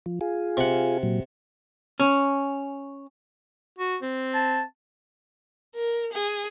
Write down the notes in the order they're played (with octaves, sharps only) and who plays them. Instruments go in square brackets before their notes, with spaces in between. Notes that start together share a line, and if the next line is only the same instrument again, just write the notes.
[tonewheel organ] F3
F4 G#4
[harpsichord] C3 F#5
[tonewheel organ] A#2 F#3
[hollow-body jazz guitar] C#4
[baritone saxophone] F#4
C4
[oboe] A5
[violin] A#4
G#4